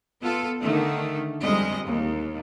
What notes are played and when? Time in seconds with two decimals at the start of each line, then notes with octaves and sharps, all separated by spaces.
0.21 B3 F4 A4
0.61 D3 D#3 A3
1.41 F2 G3 G#3 D#5
1.86 D#2